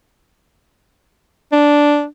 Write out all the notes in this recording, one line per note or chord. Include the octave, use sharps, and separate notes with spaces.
D4